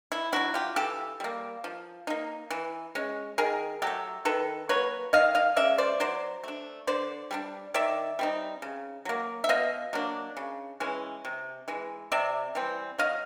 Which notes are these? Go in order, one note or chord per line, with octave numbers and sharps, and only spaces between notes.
E4
F#3 A3 D4 E4 F#4
F4 G4
E3 G4 A4
G3 A#3
F3
A#3 D#4
E3
G#3 C#4
D#3 G#4 A#4
F#3 A3 G4 A4
D#3 A4 B4
F#3 A#3 B4 C#5
D#3 D#5 F5
D#5 F5
G#3 C#4 D5 E5
C5 D5
F#3 C5 D5
A3 D4
D3 C5 D5
G3 A#3 D4
D#3 D5 E5
G3 C4 D#4
C#3
F#3 A#3
E5
B2 D#5 F5
F#3 A#3 D4
C#3
E3 G#3 C#4
C3
E3 G#3
C3 D5 E5
E3 G3 C4
F#3 D#5 F5